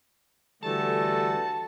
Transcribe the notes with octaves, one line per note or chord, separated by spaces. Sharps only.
D3 E3 G3 A3 F#4 A4 A5